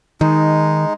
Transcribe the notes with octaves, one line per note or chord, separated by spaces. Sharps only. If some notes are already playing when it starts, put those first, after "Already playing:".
D#3 G#3 D#4